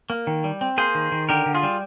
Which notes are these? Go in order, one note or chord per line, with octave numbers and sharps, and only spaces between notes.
A#3
D#3
G3
C4
A#3 G#4 C5
D#3
D#3
D3 G4 A#4
D3
F4 G#4
G3